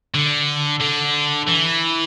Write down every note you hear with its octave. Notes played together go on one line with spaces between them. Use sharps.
D3
D3
E3